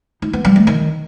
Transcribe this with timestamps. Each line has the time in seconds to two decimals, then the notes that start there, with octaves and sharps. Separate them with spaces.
0.22 D#4
0.33 B3
0.45 G3
0.56 A3
0.67 D#3